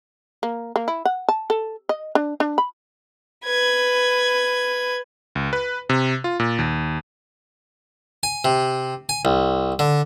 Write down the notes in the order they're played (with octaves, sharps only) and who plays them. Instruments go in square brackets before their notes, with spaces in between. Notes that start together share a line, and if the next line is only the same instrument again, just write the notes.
[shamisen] A#3
A#3
E4
F#5
A5
A4
D#5
D4
D4
B5
[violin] B4 G#6
[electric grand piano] C#2
B4
C3
F4
A#2
D#2
[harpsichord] G#5
C3
G#5
C2
D3